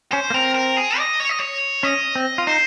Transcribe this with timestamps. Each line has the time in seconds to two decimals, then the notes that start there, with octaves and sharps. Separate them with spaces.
0.12 C#4 C5
0.30 A#3
0.34 C4 A#4
0.55 A#4
0.77 G#4
0.98 D#5
1.20 C#5
1.29 D#5
1.40 C#5
1.83 C#4 D#5
2.15 C4
2.38 F4
2.47 D#4 C5